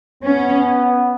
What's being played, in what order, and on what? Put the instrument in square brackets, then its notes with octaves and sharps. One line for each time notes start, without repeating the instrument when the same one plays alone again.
[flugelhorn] B3 [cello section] C#4